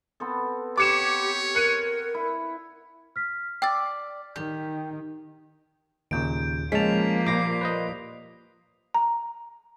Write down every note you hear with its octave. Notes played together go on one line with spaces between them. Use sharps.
B3 C4 A4
G4 C#5 D6 C#7 E7
A#4 F#6 C#7 D#7
E4
F6 B6
D5 G5 E6 A6
D#3 G4
D#2 A#2 C#3 G6 D7
F3 G#3 A#3 C#4 A5 B6 F7
A#2 G3 F4 D6 A#6 C7
B4 C5 D#5
A#5